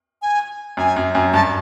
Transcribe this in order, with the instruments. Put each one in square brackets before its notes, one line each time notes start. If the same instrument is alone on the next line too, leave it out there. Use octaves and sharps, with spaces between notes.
[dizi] G#5
[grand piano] F#2 [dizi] G#5
[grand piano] F#2
F#2
[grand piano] G2 [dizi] A5